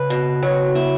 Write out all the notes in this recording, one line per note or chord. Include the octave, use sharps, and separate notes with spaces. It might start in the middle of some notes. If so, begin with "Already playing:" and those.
Already playing: C#3 B4
B2
F#3
E4